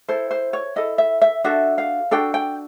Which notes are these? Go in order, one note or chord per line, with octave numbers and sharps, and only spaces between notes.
E4 A4 C5
C5
C#5
E4 A4 D#5
E5
E5
D4 F#4 A4 E5
F5
D4 F#4 A4 G5
G5